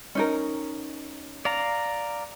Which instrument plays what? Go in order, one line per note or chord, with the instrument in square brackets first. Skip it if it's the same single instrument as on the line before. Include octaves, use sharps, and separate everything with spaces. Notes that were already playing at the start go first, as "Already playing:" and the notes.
[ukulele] C#4 D#4 A#4
[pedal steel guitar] D5 F5 A#5